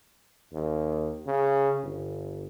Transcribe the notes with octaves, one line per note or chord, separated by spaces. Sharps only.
D#2
C#3
G1